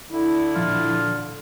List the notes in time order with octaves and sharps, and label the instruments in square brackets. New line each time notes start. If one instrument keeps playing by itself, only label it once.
[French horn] D3 [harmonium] E4
[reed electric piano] A#2 F3 D4 [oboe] F4